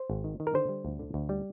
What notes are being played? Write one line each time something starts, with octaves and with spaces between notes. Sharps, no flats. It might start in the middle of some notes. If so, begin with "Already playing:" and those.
Already playing: C5
G#1
D#3
D#3
A#4
D3 C5
G3
D2
D3
D2
G3